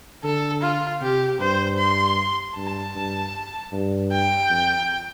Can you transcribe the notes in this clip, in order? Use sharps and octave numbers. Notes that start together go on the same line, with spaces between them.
D3 A4
F4
C3 G4
G2 C5
C6
G2 A5
G2
G2
G5
F2